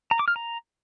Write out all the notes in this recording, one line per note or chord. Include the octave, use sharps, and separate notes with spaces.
A#5
D6
F6
A#5